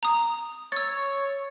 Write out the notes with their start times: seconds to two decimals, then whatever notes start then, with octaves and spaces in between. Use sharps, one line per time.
0.03 A#5 D#6
0.72 C#5 E6 A6